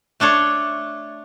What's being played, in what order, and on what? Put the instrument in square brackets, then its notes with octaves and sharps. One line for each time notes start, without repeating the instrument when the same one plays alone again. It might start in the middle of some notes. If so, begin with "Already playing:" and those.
[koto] A3 D4 A4 C#5